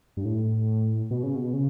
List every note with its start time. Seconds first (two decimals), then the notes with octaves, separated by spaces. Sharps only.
0.17 G2
0.25 A2
1.11 B2
1.23 C#3
1.35 B2
1.53 C#3